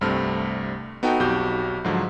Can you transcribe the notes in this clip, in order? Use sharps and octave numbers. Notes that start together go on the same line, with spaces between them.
C2 G2 A3 C4 F6
B3 D#4 F#4 A4 G5
B1 F2 F#4 G4 G6
G#2 D3 F3 F#3